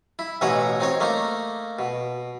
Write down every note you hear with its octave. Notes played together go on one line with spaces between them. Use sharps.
E4
A1 B2 E3 D#4 C#5
C4 D#4 C#5
A3 A#3 D#4
B2